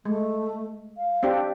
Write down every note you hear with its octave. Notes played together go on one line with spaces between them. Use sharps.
G#3 A3
F5
C4 D4 G4